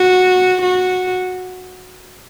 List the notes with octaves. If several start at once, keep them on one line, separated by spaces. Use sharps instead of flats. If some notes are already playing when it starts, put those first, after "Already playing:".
Already playing: F#4
F#4